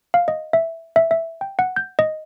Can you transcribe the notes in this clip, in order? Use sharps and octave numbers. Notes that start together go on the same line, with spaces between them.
F5
D#5
E5
E5
E5
G5
F#5
G6
D#5